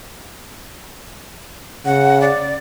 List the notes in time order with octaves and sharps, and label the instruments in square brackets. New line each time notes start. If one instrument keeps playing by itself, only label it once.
[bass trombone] C#3 [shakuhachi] F#5
[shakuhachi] D5